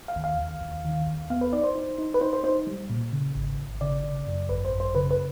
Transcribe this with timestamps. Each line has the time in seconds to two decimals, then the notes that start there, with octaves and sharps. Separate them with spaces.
0.08 F5
0.16 D#2
0.24 F5
0.38 D#2
0.61 D#2
0.85 D#3
1.07 D#2
1.30 B3 F5
1.41 B4
1.53 D#4 D5
1.64 C5
1.75 D#4
1.98 D#4
2.14 B4
2.21 D#4 C5
2.33 C5
2.44 D#4 C5
2.67 G3
2.90 A#2
3.13 C#3
3.35 G#1
3.58 G#1
3.81 C#3 D5
4.04 C#3
4.27 F#2
4.49 G#1 B4
4.65 C5
4.72 F#2
4.80 C5
4.95 C#3 B4
5.11 B4